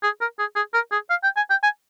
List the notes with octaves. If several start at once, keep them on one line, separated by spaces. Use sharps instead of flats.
G#4
A#4
G#4
G#4
A#4
G#4
F5
G5
G#5
G5
G#5